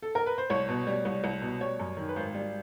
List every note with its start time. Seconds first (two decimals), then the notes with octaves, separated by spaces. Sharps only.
0.02 A4
0.15 A#4
0.26 B4
0.38 C5
0.50 C2 C#5
0.69 B2
0.87 G3
1.05 C2
1.24 C2
1.42 B2
1.61 G3 C#5
1.80 F#2
1.97 D#3
2.08 B4
2.16 G#1 C5
2.34 G3